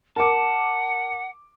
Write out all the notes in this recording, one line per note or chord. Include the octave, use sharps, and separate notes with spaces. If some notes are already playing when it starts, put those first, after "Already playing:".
A#4 F#5 A5 D6